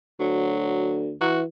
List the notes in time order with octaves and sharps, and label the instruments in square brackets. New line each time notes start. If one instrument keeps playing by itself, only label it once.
[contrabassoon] D2 [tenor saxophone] F#3
[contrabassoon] E3 [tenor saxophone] F#4